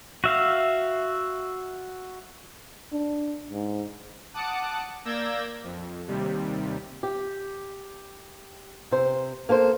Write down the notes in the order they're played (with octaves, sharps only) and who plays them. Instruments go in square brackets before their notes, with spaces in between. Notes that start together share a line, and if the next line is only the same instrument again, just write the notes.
[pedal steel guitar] F#4 E5 F5
[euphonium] D4
G#2
[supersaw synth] F#5 A5 D6 D#6 F#6 C#7
A#3 D5 E6 G6 G#6 A#6
F2
D#2 C3 G3
[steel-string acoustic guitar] G4
C3 C5
A#3 A4 B4 C5